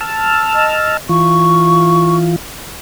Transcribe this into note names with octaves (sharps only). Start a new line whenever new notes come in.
A5 E6 F6
D#5
E3 F4 C#6